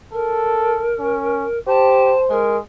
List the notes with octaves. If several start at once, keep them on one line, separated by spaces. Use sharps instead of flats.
A4 A#4
C#4
G4 C5 A5
G#3 A#4